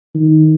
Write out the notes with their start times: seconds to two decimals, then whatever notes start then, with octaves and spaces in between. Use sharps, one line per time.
0.15 D#3